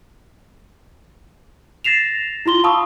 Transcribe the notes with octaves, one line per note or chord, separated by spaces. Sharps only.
A6 A#6 C7 E7 F7
E4 F4 C6 G7
F5 A5 B5 C#6 D#6 E6